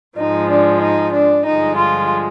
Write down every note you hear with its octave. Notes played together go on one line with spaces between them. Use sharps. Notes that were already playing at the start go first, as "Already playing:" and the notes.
G#2 F3 G#3 D#4
D4
D#4
D4
G2 D3 F3 G#3 D#4
F4